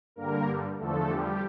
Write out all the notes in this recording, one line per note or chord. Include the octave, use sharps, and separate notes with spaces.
G2 D3 G3 A#3 A#4
E2 D3 F3 A3 A4
G3 G4